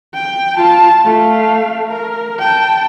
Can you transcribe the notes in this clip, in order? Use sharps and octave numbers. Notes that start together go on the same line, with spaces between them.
G5
F4 A5
A3 F5
A#4
G5 A5